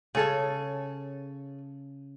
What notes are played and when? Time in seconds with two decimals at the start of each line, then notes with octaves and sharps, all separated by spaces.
0.15 C#3 G#4 A4 C#5